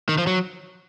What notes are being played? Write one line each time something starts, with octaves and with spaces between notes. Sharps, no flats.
D#3
F3
F#3